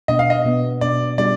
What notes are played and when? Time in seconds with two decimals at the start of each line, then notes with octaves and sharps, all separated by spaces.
0.08 B2 B3 D4 D#5
0.19 F5
0.30 D#5
0.45 B2 B3 D4
0.81 B2 B3 D4 D5
1.18 G3 B3 D4 F4 G#4 D5